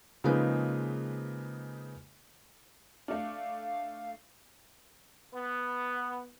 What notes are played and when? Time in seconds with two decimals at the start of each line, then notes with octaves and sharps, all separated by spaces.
0.24 C#3 F3 G#3 A#3 D#4 B4
3.08 A3 D4 F5
5.34 B3